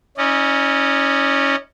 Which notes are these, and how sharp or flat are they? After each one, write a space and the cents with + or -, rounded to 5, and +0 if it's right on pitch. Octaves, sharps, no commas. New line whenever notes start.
C#4 +0 E4 -45 D#5 -45